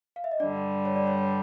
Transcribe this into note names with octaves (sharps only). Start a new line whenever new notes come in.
F5
E5
D#5
G2 D3 G3 D4 D5
C#5
D5
C#5